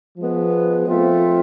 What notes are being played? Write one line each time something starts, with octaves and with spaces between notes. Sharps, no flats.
F3 G#3 B3
F3 A3 C4 F4